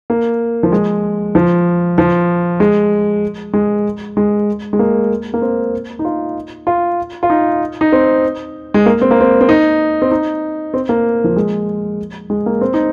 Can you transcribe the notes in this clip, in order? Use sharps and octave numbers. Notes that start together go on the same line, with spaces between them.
A#3
F3
G#3
F3
F3
G#3
G#3
G#3
G#3
A#3
A#3
C4
D#4
F4
F4
F4
D#4
D#4
C4
G#3
A#3
C4
A#3
C4
C4
D#4
C4
D#4
C4
A#3
F3
G#3
G#3
A#3
C4
D#4